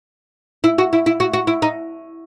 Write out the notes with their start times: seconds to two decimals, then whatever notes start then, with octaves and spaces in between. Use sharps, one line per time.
0.64 E4
0.78 F#4
0.93 E4
1.06 E4
1.20 F#4
1.33 F#4
1.47 E4
1.62 D#4